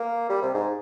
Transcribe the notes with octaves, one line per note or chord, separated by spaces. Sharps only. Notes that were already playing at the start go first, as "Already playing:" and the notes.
Already playing: A#3
G3
C3
G#2